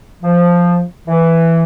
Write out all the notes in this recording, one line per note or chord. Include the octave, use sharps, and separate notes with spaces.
F3
E3